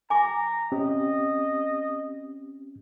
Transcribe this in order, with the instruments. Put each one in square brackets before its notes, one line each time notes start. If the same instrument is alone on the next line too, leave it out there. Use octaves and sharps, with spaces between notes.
[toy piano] G#5 D6 [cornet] A#5
[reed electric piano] C4 C#4 G4 [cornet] D#5